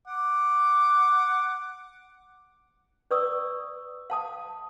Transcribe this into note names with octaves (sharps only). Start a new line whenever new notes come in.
F#5 D6
B4 D5 C#6 D#6 E6
F5 A5 D#6